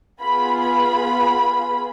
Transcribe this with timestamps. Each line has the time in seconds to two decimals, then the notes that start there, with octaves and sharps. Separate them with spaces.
0.21 B3 F4 G#4 B5
0.61 B5